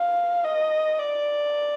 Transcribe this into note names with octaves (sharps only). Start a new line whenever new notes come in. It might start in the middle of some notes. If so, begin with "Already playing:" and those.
Already playing: F5
D#5
D5